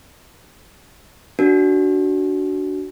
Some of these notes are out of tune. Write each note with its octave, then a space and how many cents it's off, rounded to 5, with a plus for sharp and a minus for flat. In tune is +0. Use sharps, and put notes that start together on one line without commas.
D4 -5 F#4 +15 A#4 +10